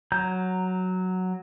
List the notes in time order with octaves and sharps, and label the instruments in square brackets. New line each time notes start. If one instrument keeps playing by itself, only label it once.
[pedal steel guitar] F#3 A#5 G6